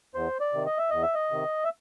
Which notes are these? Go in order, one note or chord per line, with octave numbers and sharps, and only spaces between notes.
E2 C5
D5
C3 D#3
D#5
E5
E2 D#5
E5
D#5
C3 D#3
E5